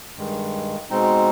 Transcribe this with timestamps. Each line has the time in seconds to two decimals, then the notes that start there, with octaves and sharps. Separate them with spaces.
0.17 G2 D#3 G#3
0.90 B2 G#3 C4 D#4